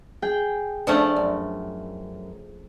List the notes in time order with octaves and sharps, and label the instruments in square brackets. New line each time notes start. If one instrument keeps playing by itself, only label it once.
[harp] G#4 G5
[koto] F3 A3 C#4 [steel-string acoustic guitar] D4
[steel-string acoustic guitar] F#2